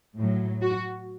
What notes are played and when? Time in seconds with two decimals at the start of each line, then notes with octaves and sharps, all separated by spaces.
0.16 A2 F#3
0.61 F#4